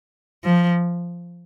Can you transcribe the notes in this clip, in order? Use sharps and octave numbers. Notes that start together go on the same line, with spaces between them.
F3